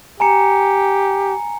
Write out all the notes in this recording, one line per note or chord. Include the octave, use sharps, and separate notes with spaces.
G4 G#5 A#5 C#7